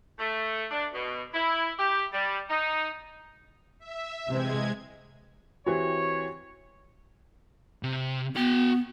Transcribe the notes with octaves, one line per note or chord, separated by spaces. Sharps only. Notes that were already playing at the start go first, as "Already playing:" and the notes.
A3
D4
B2
E4
G4
G3
D#4
E5
C3 E3 G#3 C4 G#6
E3 C4 F#4 G4 C#5
C3
B3 F#4 G5